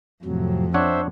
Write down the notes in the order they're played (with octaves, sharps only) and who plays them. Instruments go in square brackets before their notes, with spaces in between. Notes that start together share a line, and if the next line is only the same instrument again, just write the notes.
[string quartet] F2 [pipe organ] A2 C3 F#3
[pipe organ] C4 C5 E5 [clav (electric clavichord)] D4 C#5 F#5